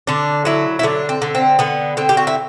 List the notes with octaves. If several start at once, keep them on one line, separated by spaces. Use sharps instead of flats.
D3 D4
F#3 E4
E4
D3 D4
C4
D3
C4
D3 B3
D3 C4
G4
F#4
E4